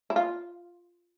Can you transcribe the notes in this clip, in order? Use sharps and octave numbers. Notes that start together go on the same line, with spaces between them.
E4
F4